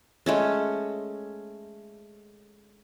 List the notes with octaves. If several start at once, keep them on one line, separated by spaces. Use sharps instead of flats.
G#3 A3 C#4